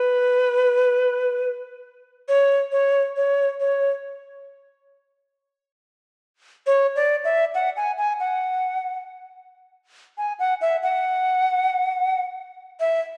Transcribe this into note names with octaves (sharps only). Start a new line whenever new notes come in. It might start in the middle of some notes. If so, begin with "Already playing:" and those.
Already playing: B4
C#5
C#5
C#5
C#5
C#5
D5
E5
F#5
G#5
G#5
F#5
G#5
F#5
E5
F#5
E5